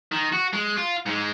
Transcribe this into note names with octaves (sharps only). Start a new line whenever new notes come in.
D#3
F#4
G#3
F4
G#2 G#3